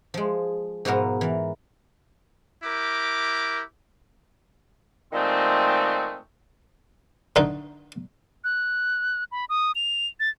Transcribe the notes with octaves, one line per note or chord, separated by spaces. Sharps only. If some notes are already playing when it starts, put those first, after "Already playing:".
F3 G#3
G#2 B2 F3 B3 A#4 A#5
E3 A#4
E4 G4 A#4 D6
A#2 D#3 G#3 A3 C4
D3 D#4
F#6
B5
D#6
F7
A6